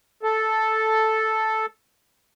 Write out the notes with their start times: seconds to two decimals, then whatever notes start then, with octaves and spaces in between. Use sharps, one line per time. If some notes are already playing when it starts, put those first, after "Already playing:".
0.23 A4